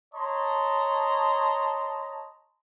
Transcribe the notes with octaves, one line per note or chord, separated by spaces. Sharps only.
C#5 D#5 A5 A#5 C6